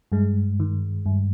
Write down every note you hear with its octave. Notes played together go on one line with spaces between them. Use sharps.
G2 G#3
D#3
G2